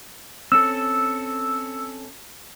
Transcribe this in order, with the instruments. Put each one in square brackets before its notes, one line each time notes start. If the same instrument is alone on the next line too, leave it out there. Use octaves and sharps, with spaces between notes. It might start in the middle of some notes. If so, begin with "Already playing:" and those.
[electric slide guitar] C4 C#4 A4 [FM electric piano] E6